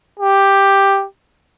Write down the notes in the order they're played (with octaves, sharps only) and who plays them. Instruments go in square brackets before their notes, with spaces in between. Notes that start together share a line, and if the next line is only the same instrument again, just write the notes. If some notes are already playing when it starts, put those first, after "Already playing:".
[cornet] G4